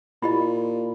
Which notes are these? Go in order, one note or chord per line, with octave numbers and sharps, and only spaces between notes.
A#2 E4 G4 D#5 B5